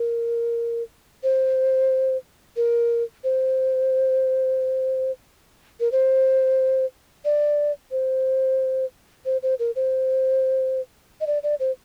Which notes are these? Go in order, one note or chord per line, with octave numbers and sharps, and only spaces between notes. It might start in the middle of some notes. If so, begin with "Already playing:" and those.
Already playing: A#4
C5
A#4
C5
A#4
C5
D5
C5
C5
C5
A#4
C5
D#5
D5
D5
C5